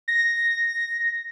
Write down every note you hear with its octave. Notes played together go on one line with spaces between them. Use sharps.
A#6